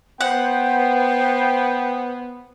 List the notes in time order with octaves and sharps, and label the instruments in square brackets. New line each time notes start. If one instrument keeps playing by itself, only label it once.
[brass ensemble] B3 [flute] C5 [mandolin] F#5 [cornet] G5